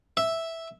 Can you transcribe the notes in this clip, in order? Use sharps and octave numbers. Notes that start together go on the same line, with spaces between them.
E5